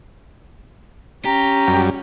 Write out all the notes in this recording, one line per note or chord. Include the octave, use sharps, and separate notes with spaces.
C#4 G4 A#5
F#2 G3